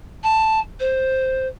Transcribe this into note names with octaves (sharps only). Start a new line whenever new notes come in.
A5
C5